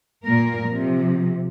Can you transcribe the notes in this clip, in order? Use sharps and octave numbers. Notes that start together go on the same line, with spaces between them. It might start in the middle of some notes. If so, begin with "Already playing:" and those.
A#2 A#3 A#4
C3 F3